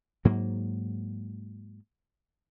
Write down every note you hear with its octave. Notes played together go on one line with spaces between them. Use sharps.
G#2 F#3 A#3